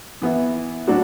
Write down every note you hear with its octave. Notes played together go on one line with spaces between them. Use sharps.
E3 B3 E4
A2 F#3 D4 F#4